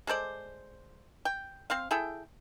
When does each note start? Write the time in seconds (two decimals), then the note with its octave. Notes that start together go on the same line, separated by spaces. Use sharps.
0.07 G#3 A4 C5 D5
1.25 G5
1.70 C4 C5 F5
1.91 E4 G#4 A4 G5